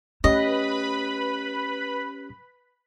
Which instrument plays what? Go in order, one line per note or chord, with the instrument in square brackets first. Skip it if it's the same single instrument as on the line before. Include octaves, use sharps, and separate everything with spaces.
[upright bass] A3 [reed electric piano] C#4 G4 [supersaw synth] B4 B5 [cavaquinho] D#5